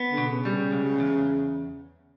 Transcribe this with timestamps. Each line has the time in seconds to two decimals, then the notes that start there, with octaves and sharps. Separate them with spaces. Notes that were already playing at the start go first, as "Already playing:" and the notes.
Already playing: B3
0.09 D3
0.17 B2
0.27 C#3
0.45 G3
0.72 C#2
1.00 E2